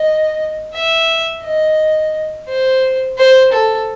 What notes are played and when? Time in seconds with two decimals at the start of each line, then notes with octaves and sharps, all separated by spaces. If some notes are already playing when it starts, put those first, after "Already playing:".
Already playing: D#5
0.74 E5
1.43 D#5
2.49 C5
3.18 C5
3.52 A4